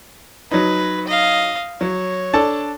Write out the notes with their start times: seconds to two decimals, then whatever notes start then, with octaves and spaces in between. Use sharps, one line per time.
0.51 F#3 D#4 B4
1.07 D#5 F5
1.81 F#3 C#5
2.33 D4 A4 A5